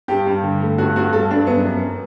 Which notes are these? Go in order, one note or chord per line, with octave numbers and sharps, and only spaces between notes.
G2 G4
G2
D3
A3
G2 F#4
G2 F#4
G2 A4
G2 D4
F#2 B3
F#2